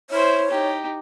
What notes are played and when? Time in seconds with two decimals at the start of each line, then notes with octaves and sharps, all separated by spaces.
0.10 E4 C5 C#5
0.51 D#4 G4